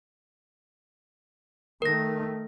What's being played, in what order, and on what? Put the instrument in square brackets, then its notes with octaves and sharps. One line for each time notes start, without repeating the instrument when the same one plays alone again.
[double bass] D#3 A3 [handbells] A#4 A#6